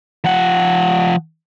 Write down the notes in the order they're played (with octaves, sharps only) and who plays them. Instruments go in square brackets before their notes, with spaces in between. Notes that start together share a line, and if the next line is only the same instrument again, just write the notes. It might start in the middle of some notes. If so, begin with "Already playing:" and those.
[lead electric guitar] F3 F#5